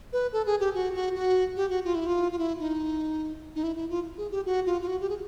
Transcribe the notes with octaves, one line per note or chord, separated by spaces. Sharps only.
B4
A4
G#4
G4
F#4
F#4
F#4
G4
F#4
F4
E4
F4
F4
E4
D#4
D#4
E4
E4
F4
G#4
G4
F#4
F4
F4
F#4
G4
G#4